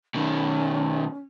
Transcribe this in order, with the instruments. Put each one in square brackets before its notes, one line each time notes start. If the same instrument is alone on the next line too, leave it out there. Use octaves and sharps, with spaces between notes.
[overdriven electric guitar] B2 D#3 [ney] C#4